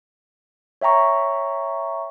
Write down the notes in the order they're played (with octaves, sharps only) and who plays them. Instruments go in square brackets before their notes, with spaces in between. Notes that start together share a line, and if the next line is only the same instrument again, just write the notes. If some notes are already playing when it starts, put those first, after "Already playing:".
[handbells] C#5 E5 G5 A#5 C#6